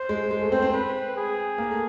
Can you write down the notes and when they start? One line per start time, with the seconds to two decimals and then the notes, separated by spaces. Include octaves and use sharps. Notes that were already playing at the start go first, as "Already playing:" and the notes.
Already playing: C5
0.09 G#3
0.31 G#3
0.41 A3
0.52 C4
0.62 C4
0.73 B4
1.16 G#4
1.58 A#3
1.70 A3